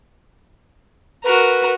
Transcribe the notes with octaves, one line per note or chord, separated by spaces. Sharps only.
F#4 A#4 B4